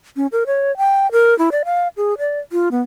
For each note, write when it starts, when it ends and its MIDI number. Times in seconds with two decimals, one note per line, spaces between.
0.16 0.27 61
0.32 0.44 70
0.46 0.75 73
0.77 1.11 79
1.12 1.36 70
1.38 1.49 64
1.52 1.63 74
1.65 1.88 77
1.97 2.14 68
2.18 2.39 74
2.52 2.69 65
2.71 2.82 59